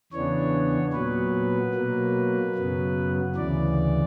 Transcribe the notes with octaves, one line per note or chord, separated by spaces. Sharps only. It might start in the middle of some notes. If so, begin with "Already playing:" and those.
E2 C#3 E3 B3 D4 C#5
A#2 F#3 B3 B4
B2 F#3 A#3
F#2 C#3 F#3 B3
D2 C#3 E3 D5